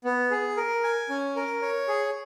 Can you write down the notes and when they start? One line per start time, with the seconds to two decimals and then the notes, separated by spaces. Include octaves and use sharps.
0.05 B3
0.31 G#4
0.57 A#4
0.84 G#5
1.09 C#4
1.36 A#4
1.62 C#5
1.88 G#4